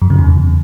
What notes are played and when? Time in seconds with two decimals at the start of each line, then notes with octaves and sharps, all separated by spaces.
0.02 F#2
0.10 C#3
0.19 E2